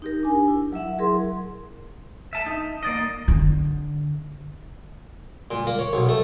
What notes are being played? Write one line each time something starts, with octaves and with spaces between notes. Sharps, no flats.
D#4 G4 A#4
D4 G#5
E4
F#3 E4 E5 F#5
F#3 G#4 A#4 C6
E5 A5
D#4
A#3 D5 D#5
D3
A#2
A#3
C#5
B1
A3